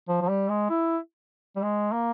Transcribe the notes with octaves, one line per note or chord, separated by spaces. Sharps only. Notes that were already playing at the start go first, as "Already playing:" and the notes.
F3
F3
G3
G#3
E4
G3
G#3
A#3